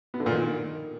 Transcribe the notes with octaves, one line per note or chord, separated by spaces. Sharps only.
B3
D3
A#2
D#3